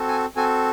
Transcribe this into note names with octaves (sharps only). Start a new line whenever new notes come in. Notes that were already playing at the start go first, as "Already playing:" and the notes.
Already playing: C4 F#4 A4
G#5
C4 F#4 A4 G#5